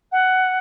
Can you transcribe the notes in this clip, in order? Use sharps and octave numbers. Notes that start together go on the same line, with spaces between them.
F#5